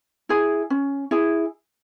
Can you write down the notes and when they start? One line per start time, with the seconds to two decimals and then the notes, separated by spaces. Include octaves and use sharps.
0.29 E4 G#4
0.70 C#4
1.11 E4 G#4